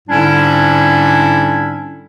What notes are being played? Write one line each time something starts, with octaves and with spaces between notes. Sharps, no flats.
G#2 D3 G3 C#4 D4 E4